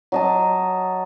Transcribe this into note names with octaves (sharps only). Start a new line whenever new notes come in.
F#3 D#5 A5